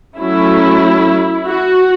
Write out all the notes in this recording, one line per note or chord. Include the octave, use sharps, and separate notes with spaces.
F#3 A3 C#4 E4
F#4